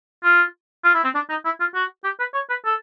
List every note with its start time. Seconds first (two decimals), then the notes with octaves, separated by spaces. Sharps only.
0.24 F4
0.84 F4
0.94 E4
1.04 C4
1.15 D4
1.29 D#4
1.45 E4
1.60 F4
1.75 F#4
2.04 G4
2.19 B4
2.34 C#5
2.50 B4
2.65 A4